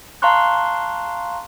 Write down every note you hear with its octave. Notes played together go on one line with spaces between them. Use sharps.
F5 A5 A#5 C6 C#6 F#6